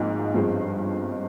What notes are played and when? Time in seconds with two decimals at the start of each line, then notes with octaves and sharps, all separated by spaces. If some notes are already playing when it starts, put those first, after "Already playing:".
Already playing: G#1 G#2 F3 A#3
0.34 G1 G2 F3 G#3 C4